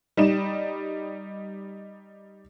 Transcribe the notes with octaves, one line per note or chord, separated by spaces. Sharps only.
G3 D#4 E7